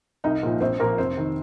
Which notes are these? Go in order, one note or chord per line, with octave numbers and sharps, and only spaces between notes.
C2 D#4 D#5
A#2 F3
A#1 C4 C5
A#2 F3 A#3 A#4
F1 C4 C5
D#3